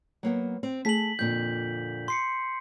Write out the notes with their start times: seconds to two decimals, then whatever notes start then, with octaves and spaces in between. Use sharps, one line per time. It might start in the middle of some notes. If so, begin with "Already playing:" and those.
0.23 F#3 A#3 B3
0.63 C4
0.85 A3 G#4 A5 B6 F#7
1.19 F2 A#2 D3 G6
2.08 C6 C7 C#7